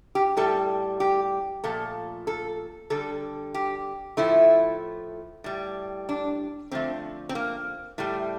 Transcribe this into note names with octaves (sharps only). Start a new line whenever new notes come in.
G4
A2 G3 A4
G4
A#2 F3 A3 A4
A4
D3 G3 A4
G4
A2 F3 A3 E4
A2 G3
D4
D3 F3 A3 C4
C4
A#3
A2 G3 A3